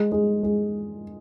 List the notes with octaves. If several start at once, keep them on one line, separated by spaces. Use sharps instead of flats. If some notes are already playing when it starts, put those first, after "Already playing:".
Already playing: G#3
G#3
G#3